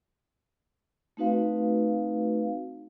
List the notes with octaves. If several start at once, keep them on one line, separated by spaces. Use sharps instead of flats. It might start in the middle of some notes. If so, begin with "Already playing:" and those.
A3 C4 D#4 F#4 B4 F5